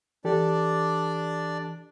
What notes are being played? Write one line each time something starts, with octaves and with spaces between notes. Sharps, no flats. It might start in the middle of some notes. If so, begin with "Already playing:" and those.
E3 D4 G4 A4 D5